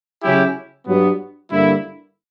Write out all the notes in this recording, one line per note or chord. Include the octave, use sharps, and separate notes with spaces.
C#3 F#3 C#4 E4 G4
G2 F#3 B3
G2 D3 G3 A#3 E4